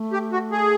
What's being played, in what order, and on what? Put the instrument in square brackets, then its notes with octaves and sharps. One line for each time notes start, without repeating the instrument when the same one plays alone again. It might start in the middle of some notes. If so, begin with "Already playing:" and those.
Already playing: [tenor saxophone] A3
[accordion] G4
F#4
G#4